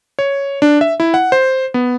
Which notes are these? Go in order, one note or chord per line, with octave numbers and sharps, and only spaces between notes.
C#5
D4
E5
E4
F#5
C5
B3